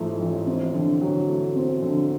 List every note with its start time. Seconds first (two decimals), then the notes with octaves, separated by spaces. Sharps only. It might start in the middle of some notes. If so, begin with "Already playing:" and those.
Already playing: A1 G#2 F3 A3
0.20 A1
0.47 C4
0.74 D3
1.01 F#3
1.28 A3
1.56 C4
1.82 D3